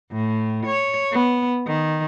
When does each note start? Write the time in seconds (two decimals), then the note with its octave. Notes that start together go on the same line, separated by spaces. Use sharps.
0.11 A2
0.67 C#5
1.12 B3
1.66 D#3